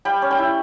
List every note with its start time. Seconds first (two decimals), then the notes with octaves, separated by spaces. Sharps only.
0.05 G3 G5 B5
0.22 C#4
0.31 G5 B5
0.38 E4